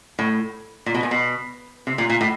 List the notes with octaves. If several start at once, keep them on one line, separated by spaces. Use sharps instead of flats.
A2
A#2
B2
A#2
B2
C3
A#2
A#2
A2